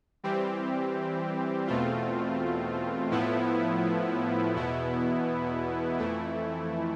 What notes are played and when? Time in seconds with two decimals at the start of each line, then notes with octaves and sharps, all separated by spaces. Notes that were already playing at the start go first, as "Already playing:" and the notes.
0.23 E3 G3 C4 G4
1.67 E2 B2 A3 C4 F4
3.11 A2 F3 B3 E4
4.55 E2 B2 B3 E4
5.98 F2 E3 A3 E4